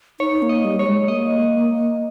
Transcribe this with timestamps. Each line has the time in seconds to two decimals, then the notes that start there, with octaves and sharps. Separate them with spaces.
0.20 D#4 C#5
0.42 A#3
0.49 D#5
0.65 G3
0.79 G3 C#5
0.86 G#3
1.08 A#3 D#5